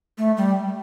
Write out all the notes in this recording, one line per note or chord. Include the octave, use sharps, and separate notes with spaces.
A3
G3